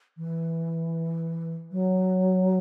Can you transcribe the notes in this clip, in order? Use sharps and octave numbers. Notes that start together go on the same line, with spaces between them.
E3
F#3